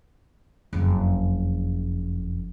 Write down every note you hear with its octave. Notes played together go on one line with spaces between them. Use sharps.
F#1 F2